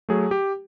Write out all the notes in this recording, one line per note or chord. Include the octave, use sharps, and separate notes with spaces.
F#3 A3 G#4
G4